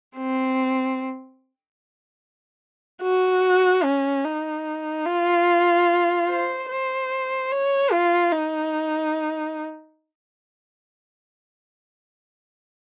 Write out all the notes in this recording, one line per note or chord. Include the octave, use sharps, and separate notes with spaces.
C4
F#4
C#4
D#4
F4
C5
C5
C#5
F4
D#4